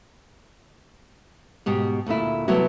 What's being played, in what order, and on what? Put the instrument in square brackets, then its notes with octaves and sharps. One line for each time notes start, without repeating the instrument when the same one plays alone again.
[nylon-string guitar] G#2 B2 G4
D2 A#2 A3 E4
C3 F#3 A3 B3 E4 F#4